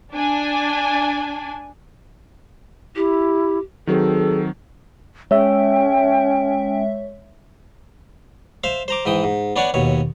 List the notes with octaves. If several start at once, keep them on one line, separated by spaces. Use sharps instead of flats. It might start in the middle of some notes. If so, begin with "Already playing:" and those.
D4 G#5
E4 G4
D#3 F#3 C4 G#4 A4
G#3 C#4 C#5 E5 G5
C5 E5 F5
C5 A#5 D6
G#2 E3 G5 D#6
G#2
B3 D4 C#5 D5 F#5 G#5
D#2 B2 C#5